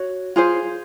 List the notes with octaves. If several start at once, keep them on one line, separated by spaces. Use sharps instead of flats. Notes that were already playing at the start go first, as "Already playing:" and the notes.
Already playing: F#4 C#5
F4 G#4 C5